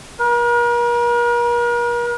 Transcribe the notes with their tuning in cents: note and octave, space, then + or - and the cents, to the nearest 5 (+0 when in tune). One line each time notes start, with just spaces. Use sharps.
A#4 +40